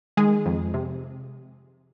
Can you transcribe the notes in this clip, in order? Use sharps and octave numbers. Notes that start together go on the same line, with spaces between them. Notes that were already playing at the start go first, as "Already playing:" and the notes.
D#3 G#3 G#4
F2
C3